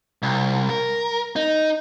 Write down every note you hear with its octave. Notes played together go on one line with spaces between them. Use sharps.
C2
A#4
D#4